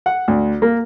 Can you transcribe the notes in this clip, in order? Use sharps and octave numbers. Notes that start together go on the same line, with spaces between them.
F#5
D2
A#3